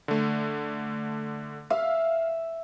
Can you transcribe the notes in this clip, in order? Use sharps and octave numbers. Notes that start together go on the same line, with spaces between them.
D3 A3
E5 F5